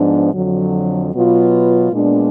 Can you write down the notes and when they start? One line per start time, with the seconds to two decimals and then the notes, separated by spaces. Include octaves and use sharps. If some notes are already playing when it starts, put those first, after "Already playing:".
Already playing: G#2 F3 B3 D4
0.33 F2 D3 F#3
1.13 B2 F#3 B3 F4 B4
1.92 A#2 G#3 B3 D4